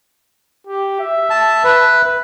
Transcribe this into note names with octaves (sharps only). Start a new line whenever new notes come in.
G4
E5
A5
B4